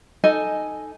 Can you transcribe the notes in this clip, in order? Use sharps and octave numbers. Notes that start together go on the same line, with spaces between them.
D#4 A4 D#5 G#5